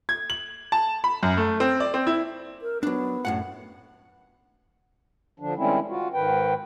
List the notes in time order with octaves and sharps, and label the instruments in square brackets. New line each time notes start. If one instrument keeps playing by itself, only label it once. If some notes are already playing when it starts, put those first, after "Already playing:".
[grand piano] G#6
F#7
A5
B5
F#2
A3
C4
D5
C4
E4
[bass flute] A#4
[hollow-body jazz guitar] F#3 D4 [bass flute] B3
[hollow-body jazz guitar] F#2 A2 F#5
[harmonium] D3 F3 D4
D#3 G3 G#3 C4 C#4 E4
F4 F#4
G#2 D#3 B4 G5